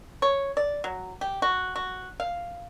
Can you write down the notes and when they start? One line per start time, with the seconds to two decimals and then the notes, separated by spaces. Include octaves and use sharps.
0.22 C#5
0.57 D5
0.84 F#3
1.21 G4
1.42 F#4
1.76 F#4
2.20 F5